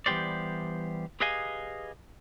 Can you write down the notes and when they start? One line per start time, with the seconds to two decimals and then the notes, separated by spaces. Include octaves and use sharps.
0.06 E3 G3 B3 G4 C5 D5
1.20 G4 G#4 B4 D#5 F5 G#5